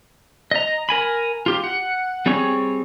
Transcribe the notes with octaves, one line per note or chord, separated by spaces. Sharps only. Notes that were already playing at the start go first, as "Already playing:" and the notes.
D#5 A#5
A#4 G#5 B5
F4 G4
F#5
G3 C4 G#4 C#5 C#6